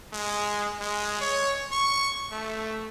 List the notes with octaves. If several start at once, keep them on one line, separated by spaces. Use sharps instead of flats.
G#3
G#3
C#5
C#6
A3